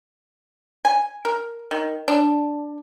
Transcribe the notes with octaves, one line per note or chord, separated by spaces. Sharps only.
G#5
A#4
D#3
D4